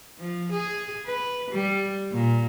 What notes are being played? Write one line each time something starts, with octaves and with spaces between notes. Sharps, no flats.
F3
G#4
B4
G3
A#2